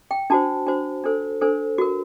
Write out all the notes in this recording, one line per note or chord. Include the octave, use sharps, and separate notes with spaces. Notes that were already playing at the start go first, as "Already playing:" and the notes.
G5
D4 F#4 C5 A5
D4 F#4 C5
D4 A4 C5
D4 A4 C5
F#4 A#4